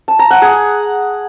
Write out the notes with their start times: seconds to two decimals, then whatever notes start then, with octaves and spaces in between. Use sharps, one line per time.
0.08 A5
0.19 A#5
0.31 F#5
0.42 G#4